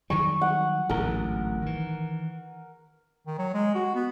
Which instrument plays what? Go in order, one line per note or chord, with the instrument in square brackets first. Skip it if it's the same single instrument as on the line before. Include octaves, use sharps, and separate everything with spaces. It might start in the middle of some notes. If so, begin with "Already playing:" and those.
[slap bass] D#3 F#3 G3 [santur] C#6
[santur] F#5
[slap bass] D1 A1 G#2 [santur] A#4
[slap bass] D#3 E3
[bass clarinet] D#3
F#3
G#3
F#4
B3